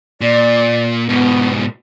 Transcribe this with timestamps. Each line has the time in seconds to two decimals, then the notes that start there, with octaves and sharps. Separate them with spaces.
0.21 A#2 D5
1.09 G#2 B2 B3